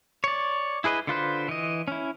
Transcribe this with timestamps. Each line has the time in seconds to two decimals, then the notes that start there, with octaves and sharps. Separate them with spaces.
0.24 C#5 D5
0.84 E4 G#4 B4 D#5
1.07 D3 F4 B4 C5
1.48 E3 D#5
1.88 C#4 E4